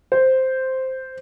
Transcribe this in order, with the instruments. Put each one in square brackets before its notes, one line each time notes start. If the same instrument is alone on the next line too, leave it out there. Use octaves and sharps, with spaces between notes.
[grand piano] C5